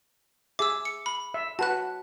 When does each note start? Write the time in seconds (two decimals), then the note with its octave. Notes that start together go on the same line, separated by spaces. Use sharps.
0.59 G#4 E5 D6 E6
0.85 C#7
1.06 B5
1.34 E5
1.59 F#4 B4 F#5 A5 F#6